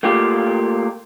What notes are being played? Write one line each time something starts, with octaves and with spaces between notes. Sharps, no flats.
A3 A#3 F4 G4